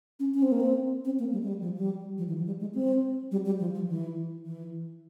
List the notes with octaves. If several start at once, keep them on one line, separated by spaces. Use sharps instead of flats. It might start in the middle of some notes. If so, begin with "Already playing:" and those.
C#4
C#4
C4
A#3
C4
C4
A#3
G3
G#3
G3
F3
G3
F3
E3
F3
G3
G#3
C4
G3
G3
F3
F3
E3
E3